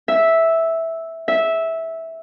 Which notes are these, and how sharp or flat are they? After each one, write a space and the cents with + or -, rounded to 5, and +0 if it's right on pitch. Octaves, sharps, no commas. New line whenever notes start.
E5 -5
E5 -10